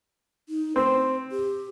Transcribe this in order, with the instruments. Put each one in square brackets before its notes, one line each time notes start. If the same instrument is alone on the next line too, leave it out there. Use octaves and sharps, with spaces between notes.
[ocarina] D#4
[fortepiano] C4 [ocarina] C5
[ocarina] G4